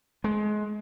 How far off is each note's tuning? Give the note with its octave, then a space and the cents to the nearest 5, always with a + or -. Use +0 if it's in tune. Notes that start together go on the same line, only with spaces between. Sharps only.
G#3 +25